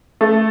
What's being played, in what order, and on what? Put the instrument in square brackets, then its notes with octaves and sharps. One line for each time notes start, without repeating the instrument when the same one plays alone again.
[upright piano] A3